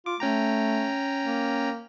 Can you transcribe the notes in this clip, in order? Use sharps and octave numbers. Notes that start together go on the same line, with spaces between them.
F4 D6
A3 C#4 G5 A#5
A#3